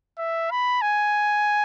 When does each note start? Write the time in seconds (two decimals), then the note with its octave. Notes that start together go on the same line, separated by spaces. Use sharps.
0.18 E5
0.51 B5
0.82 G#5